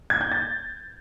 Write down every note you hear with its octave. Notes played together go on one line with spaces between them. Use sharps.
G#6
G6
A6